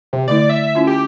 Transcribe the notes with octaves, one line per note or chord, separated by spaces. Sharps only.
C3
D3 A3 E4 D5
E5
C#4 E4 F4
G4